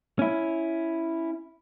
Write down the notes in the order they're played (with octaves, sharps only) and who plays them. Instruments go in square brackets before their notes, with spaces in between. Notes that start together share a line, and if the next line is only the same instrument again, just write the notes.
[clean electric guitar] C#4 E4